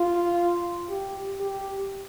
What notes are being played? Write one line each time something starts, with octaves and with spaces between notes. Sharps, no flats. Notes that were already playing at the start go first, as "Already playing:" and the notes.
Already playing: F4
G4
G4